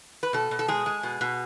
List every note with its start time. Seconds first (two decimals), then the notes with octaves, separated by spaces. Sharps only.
0.23 B4
0.33 B2 A4
0.51 B2
0.59 A4
0.68 G#3 G#4
0.86 G#3
1.03 B2
1.21 B2